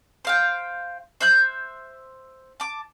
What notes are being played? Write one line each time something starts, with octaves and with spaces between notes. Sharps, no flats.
C5 F5 G5
C5 E5 F#6 G6
A5 D6